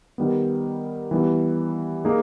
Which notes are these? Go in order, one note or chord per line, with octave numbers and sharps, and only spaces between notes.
D#3 G3 B3
E3 G3 B3
A#3 D#4 G#4